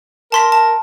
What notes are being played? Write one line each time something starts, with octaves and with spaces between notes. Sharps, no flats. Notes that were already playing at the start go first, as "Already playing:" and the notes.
A#4 A5 C6 B6
A5